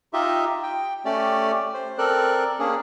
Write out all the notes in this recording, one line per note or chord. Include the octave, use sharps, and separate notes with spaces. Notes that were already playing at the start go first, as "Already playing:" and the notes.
D#4 F4 G4 D#5 E5
G5
A3 C#4 G4 D5
C5
C4 A4 A#4 D5 F#6
A#3 C#4 D4 G#4